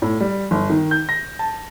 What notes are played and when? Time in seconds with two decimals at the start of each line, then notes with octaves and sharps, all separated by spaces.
0.02 A2
0.20 G3
0.51 G1
0.70 D#3
0.91 G6
1.09 A#6
1.39 A5